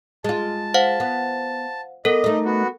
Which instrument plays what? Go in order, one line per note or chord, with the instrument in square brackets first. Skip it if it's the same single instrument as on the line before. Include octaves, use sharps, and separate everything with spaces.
[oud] G#3 F4 [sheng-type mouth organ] A5
[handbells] C5 F5 F#5
[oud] B3
[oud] B3 [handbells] A4 A#4 [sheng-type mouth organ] D#5
[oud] A3 D#4
[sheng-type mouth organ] B3 F#4